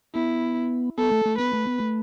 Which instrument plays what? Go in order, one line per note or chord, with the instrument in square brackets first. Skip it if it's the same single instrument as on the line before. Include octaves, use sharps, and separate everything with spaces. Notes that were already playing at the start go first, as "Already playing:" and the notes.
[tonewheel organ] B3 [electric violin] E4
[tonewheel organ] B3 [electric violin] A4
[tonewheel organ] A3
A3
[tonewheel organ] B3 [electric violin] B4
[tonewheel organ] A3
B3
A3